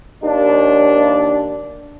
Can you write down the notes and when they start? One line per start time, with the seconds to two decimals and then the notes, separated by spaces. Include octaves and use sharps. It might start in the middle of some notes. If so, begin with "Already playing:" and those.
0.24 D#2 D4